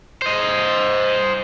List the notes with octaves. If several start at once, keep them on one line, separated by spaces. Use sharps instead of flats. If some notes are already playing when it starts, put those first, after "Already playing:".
C5 D#5